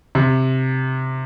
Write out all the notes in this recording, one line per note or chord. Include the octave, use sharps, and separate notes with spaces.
C3